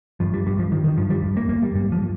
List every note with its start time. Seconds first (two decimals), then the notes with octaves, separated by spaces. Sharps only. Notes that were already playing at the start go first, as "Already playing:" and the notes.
0.20 G2 F3
0.34 G3
0.46 G2 G3
0.59 F3
0.72 G2 D#3
0.84 D#3
0.97 G2 F3
1.10 G3
1.24 G2
1.37 A#3
1.49 G2 A#3
1.63 G3
1.75 G2 G3
1.92 F3